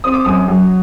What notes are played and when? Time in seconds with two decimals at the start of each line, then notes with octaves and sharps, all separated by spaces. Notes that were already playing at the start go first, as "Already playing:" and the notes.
0.04 C4 D#6
0.14 D6
0.25 F#2 D#6
0.48 F#3